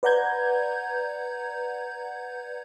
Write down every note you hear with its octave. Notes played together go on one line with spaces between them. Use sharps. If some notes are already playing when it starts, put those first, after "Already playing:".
B4 D5 F#5 A#5 G6 G#6